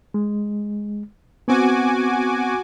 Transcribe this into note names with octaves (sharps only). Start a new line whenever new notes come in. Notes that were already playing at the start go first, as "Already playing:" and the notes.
G#3
B3 C4 F#4 G#5 D6